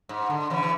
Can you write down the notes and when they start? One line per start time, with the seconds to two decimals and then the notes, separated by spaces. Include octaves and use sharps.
0.09 G#2
0.30 D3
0.50 C#3 E3
0.63 E3